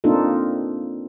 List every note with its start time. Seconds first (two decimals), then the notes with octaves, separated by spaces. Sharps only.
0.04 A#3 C4 D4 D#4 F4 A4